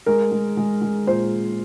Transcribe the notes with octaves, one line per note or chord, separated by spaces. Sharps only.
G#3 A#4
G#3
G#3
G#3
A#2 C5